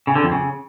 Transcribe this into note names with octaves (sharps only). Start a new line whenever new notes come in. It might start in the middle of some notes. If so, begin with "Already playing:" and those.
C#3
D3
F2
C#3